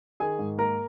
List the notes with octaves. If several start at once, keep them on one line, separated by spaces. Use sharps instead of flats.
D#3 G#4 G#5
G#2
A#3 A#4 A#5